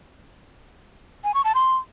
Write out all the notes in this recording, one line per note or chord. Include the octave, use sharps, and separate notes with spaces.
G#5
C#6
A5
C6